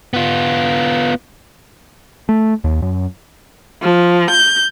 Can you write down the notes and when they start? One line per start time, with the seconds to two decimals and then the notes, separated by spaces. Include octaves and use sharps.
0.14 B3 F4
2.29 A3
2.64 D#2
2.82 F#2
3.82 F3
4.32 G6